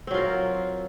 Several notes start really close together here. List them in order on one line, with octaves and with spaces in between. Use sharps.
C4 F#3 F4 A#4